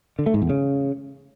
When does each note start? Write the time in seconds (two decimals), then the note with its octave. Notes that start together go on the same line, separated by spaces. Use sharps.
0.19 D3
0.26 A3
0.34 G#2
0.42 E2
0.49 C#3